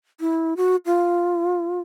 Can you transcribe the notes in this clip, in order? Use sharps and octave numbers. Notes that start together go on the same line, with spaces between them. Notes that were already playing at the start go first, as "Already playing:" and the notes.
E4
F#4
F4